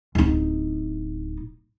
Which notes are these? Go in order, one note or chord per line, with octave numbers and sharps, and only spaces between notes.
D1 D#4